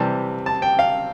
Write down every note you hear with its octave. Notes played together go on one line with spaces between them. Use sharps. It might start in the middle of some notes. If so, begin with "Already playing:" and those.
Already playing: C3 E3 G3 A5
A5
G5
F5